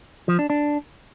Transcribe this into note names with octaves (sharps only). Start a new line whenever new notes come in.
F3
D4
D4